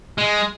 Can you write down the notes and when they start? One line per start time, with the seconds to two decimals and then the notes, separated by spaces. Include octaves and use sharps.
0.18 G#3